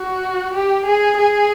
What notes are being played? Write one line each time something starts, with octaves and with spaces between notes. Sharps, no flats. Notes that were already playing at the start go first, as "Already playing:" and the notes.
Already playing: F#4
G4
G#4
G#4